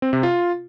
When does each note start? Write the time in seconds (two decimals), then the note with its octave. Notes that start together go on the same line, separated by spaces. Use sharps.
0.02 C4
0.13 C3
0.23 F4